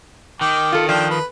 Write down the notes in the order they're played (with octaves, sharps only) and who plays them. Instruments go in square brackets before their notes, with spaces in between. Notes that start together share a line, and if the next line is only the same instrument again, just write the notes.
[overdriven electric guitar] D#3 [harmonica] G5 D6
[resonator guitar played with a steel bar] F4 A4
[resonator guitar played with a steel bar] F3 [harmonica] D4 G5
[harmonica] B4